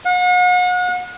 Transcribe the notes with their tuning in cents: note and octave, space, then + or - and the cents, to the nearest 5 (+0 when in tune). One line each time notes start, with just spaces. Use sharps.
F#5 -40